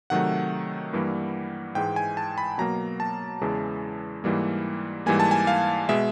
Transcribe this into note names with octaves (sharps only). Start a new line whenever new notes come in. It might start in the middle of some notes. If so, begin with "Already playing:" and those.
C3 D#3 F#3 A3 F#5
G2 E3 G3 A#3
G#2 E3 G#3 G5
G#5
A5
B5
B2 F#3 A#3 A#5
A5
E2 C#3 E3 G#3
G#2 E3 G3 A#3
G#2 E3 G3 A#3 G#5
A5
G#5
F5
B2 G#3 E5